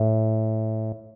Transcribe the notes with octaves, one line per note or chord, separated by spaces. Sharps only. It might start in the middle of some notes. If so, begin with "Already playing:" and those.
Already playing: A2